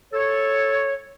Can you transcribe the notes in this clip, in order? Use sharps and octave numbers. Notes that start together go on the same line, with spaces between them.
A4 C#5